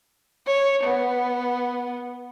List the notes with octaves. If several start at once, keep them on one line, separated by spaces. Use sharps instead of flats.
C#5
B3